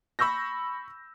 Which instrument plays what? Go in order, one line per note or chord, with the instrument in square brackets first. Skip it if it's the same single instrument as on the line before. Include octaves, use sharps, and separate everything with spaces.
[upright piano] B5 C#6 E6 G6 A#6